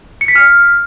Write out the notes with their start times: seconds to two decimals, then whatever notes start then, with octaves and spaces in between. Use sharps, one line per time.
0.21 C#7
0.28 B6
0.35 F6